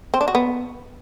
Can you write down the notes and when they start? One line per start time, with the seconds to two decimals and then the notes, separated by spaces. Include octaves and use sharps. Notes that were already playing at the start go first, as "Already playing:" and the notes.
0.14 C4
0.21 D4
0.28 F#4
0.35 B3